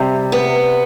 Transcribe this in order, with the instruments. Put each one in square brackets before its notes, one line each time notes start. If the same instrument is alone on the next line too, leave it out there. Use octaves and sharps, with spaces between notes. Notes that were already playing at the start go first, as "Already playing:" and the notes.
Already playing: [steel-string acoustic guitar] C3 G3
B3